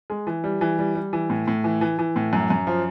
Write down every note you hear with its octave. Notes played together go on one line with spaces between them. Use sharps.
G#3
E3
G3
E3
G3
G3
E3
A2
A2
E3
E3
E3
A2
F#2
F#2
F3